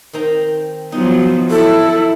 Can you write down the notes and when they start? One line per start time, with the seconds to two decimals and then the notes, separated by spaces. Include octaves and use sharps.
0.13 D#3 C4 A#5
0.92 F3 F#3 B3 D#4
1.50 E4 A4